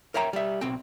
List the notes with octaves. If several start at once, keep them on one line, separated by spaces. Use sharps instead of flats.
A#4 C#5 E5 G5 A#5
G3 E5
B1 C4 G5